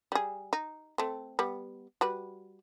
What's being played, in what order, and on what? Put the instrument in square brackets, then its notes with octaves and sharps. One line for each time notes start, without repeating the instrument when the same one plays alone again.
[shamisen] G3 G#4
D#4
A3 C4
G3 B3
G3 F#4 B4